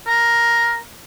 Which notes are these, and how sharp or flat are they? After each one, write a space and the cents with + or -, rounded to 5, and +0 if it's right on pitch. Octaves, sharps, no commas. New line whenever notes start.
A#4 +5